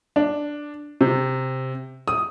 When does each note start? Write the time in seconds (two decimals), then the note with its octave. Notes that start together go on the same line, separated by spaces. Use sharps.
0.16 D4
1.01 C3
2.08 D#6